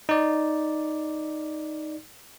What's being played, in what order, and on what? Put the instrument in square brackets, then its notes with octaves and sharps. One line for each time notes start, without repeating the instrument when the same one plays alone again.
[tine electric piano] D#4 D5